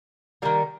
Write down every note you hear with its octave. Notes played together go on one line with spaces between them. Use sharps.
D#3 G3 A#3